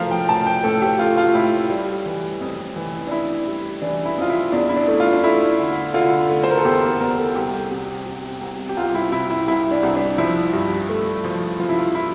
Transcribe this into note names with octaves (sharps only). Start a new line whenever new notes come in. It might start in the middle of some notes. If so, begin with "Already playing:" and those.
Already playing: A2 F3 A3 A#4 F5
G5
A2 A5
G5
A2 A4
G4
A3 F4
F4
A2 E4
G3
E3
F2
E3
D4
E3 E4
G3
E3 D4
E4
F2 F4
E4
E2 D4
E4
D4
A3
F4
D4
A3 E4
D3
D3 F4
A3
C5
A#4
A4
E2 G4
A#4
E2 A#4
A4
C2 G4
C3
C3
C2
G4
C2 F4
E4
C3 E4
E4
C2 E4
D4
C2
D4
F3 E4
G2
A3
F3
F3 F4
E4
F4
E4